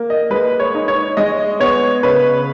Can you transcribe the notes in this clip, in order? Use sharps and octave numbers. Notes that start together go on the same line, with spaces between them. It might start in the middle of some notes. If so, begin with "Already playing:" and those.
Already playing: A#3
D#5
G#3 B4
C#5
D#4
C#5
G#3 D#5
B3 C#5
C#3 B4